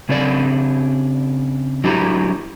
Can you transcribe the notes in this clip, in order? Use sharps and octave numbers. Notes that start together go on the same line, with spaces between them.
C#3 C4 D4 C#5 D5
F#3 D4 E4 G4 A#5